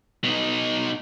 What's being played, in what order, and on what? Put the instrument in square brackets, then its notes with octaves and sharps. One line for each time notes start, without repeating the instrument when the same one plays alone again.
[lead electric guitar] B2 D#4